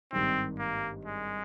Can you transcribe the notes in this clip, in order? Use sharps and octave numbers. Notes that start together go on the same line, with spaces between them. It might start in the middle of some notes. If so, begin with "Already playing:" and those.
G#1 G2 D#3 C4
A#3
G#3